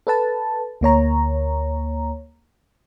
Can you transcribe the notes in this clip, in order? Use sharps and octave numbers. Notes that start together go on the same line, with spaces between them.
A4 B4 A5
D2 A#3 C#5 A#5